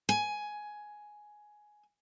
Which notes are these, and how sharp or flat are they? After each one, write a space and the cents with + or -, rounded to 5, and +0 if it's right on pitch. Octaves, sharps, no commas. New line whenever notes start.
G#5 +10